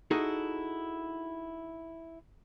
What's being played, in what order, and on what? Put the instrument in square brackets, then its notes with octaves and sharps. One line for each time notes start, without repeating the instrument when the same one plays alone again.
[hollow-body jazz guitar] D#4 E4 F#4 G#4 A4